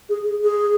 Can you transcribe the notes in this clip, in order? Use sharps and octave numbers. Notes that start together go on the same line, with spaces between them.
G#4
G#4
G#4